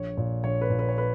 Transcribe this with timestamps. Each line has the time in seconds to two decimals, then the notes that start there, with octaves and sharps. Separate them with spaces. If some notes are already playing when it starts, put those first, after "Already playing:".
Already playing: A#1 C#5
0.17 A#2
0.44 A#1 C#5
0.61 B4
0.70 A#2
0.79 B4
0.89 C#5
0.98 B4